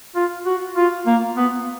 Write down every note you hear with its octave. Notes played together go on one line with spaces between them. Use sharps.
F4
F#4
F4
A#3
B3